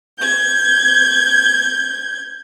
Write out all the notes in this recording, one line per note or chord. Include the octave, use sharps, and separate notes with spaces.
G6 G#6